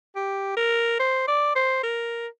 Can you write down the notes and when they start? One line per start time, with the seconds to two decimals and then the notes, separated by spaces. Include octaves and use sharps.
0.16 G4
0.57 A#4
0.99 C5
1.28 D5
1.55 C5
1.83 A#4